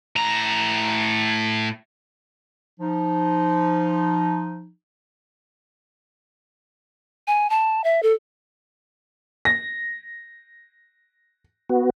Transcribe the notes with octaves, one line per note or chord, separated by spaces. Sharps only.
A2 A#5
F3 D#4
G#5
A5
E5
A4
A#6
B3 F#4